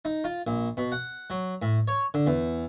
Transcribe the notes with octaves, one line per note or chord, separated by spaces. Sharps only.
D#4
F4
A#1
B2
F#5
F#3
A2
C#5
D3
E2